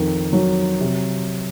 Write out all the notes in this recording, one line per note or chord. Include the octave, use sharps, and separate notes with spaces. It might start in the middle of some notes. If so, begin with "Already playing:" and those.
Already playing: F2 D#3
F#3
C3